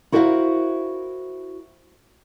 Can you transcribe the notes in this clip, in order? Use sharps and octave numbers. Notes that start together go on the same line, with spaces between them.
E4 F#4 A#4 C5 E5 F5